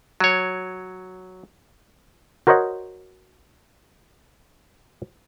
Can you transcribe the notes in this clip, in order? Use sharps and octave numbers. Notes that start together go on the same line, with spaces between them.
F#3 C#5
F#4 A#4 C5 C#5 D#5 F#5